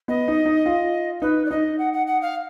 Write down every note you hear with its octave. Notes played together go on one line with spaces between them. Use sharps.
B3 D#5
D#4
D#4
F4
D#4 B4
D5
D#4 D#5
F#5
F#5
F#5
F5